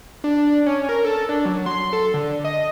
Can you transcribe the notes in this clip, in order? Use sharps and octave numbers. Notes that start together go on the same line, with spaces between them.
D4
C#4
A#4
A4
D4
F#3
C6
A4
D3
D#5